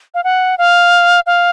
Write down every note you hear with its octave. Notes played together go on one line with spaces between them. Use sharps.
F5
F#5
F5
F5